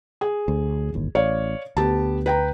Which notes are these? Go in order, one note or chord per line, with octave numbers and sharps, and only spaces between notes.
G#4
D2
D1 G1 D#2
A1 C#5 D5 F5
D2 B3 G4 A5
B4 G5 A#5